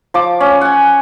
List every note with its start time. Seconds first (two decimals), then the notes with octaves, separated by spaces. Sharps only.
0.14 F3 D6
0.40 C#4
0.61 F#5 G#5